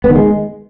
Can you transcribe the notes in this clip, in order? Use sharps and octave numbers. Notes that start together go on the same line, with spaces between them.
B3
D#3
G#3